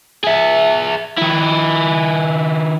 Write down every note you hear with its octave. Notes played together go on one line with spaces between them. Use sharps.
G#4 E5
D#3 E4